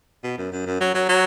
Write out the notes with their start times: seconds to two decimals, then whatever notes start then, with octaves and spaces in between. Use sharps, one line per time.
0.23 B2
0.38 F#2
0.52 F#2
0.66 F#2
0.80 F#3
0.94 F#3
1.09 F#3